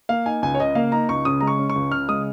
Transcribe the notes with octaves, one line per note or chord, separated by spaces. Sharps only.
A#3 F5
D#4 G#5
C#2 G#5
C#5
C#3 D#5
A#3 F5
D#4 A#5
C#2 C#6
C#3 D#6
G#3 A#5
C#6
C#4
C#6
C#2
C#3 F6
G#3 D#6